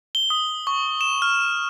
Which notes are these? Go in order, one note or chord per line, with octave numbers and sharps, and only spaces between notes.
G7
D#6
C#6
E7
F6